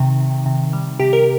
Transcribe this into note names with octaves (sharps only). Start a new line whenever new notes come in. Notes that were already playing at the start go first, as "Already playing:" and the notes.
Already playing: C3 D#3
C3
C3
G3
C3 G4
A#4